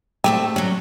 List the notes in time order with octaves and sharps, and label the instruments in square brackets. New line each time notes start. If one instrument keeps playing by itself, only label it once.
[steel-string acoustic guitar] A3 C4 A4 [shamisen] G4
[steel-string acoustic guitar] F#3 C#4